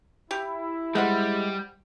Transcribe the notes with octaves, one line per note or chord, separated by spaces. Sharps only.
E4 G4
G3 G#3 C5 F#5 B5